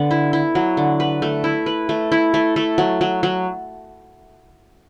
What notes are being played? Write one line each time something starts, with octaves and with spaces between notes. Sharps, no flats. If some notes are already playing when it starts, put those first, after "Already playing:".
Already playing: D3 B3
E4
E4
F#3
D3
B4
A3
E4
B4
A3
E4
A3
A3
F#3
F#3
F#3